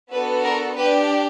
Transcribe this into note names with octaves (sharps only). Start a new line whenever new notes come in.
B3 D4 F#4 A4 B4
A#4
D4 G4 B4